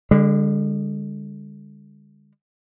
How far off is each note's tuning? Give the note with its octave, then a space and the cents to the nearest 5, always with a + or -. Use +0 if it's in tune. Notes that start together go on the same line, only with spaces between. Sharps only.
D3 +0 G#3 -40